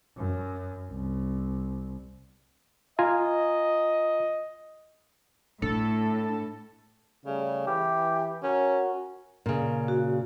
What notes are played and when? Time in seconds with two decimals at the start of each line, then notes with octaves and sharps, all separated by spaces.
0.17 F#2
0.90 C2
2.99 F4 D#5 G#5 A#5
5.62 A2 D4 A4
7.26 C#3 G3 A3
7.67 E3 G4
8.43 C#4 F#4 A#4
9.46 A#2 C#3
9.88 F#4